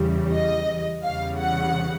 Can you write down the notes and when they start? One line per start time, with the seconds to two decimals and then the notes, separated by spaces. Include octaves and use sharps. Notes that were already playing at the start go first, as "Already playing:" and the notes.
Already playing: E2 C#3 E3 G3
0.32 D#5
1.03 E2 C#3 E3 G3 F5
1.38 F#5